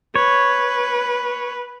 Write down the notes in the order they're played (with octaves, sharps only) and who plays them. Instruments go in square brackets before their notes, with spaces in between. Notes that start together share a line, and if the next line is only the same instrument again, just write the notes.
[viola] B4 [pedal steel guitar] C#5